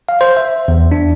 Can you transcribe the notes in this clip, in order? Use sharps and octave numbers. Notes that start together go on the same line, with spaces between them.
F5
C5
E5
E2
D4